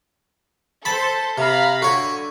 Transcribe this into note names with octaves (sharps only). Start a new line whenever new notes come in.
A4 C5 A5 B5
C3 F5 A#5 B5
D3 F#4 C#5